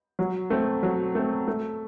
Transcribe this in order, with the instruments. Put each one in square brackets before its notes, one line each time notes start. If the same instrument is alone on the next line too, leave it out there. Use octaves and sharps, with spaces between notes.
[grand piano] F#3
A3 C4
F#3
A3 C4
A3